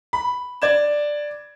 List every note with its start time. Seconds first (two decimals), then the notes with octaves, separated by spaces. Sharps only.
0.13 B5
0.62 D5 G#6 E7